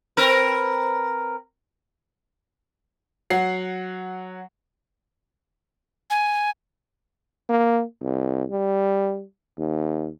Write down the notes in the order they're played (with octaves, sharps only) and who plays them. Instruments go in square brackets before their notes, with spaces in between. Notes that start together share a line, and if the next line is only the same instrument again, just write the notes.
[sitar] C4 A#4 B4
[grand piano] F#3 F#5 C7
[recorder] G#5
[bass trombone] A#3
C2
G3
D#2